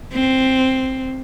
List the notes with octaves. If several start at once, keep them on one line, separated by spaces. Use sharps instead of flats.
C4